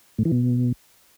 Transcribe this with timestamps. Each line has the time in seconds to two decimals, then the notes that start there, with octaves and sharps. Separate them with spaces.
0.18 A2
0.25 E3
0.32 B2